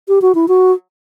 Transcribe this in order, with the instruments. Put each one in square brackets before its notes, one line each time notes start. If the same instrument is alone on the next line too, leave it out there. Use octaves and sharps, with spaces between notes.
[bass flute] G4
F#4
E4
F#4